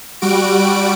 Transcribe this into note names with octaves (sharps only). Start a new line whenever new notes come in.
G3 F#4 D7